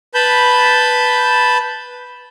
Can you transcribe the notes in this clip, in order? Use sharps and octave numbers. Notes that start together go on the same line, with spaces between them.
B4 A5 B5 G6